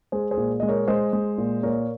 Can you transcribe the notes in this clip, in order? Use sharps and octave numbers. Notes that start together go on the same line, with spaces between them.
G#3 G#4 C5
G#4 C5
A#2
G#3 D#5
A#4 C#5
G#3 C5 D#5
G#3
A#2
A#2 A#4 C#5